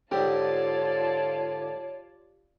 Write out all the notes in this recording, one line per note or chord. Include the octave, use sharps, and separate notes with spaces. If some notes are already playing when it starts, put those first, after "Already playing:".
G#2 D3 F4 G4 C#5 D5 A5